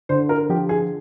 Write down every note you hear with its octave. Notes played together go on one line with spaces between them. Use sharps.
D3 C5
A#4
F3 G4
G#4